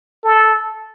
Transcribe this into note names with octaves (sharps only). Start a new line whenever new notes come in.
A4